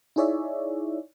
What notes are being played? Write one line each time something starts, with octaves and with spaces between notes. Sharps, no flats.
D#4 E4 G#4 C#5 D5 E5